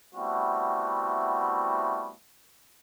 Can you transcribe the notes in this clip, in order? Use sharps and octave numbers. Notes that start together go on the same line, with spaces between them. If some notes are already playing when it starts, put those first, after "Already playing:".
G3 A3 B3 C4 E4 F#4